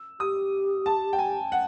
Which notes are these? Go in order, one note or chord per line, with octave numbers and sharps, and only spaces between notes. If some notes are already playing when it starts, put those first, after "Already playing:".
Already playing: E6
G4 D#6
A5
G5
G#5
F#5